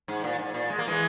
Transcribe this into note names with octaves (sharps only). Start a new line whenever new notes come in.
G#2
A#2
G#2
A#2
G#3
A#3
E3 G#3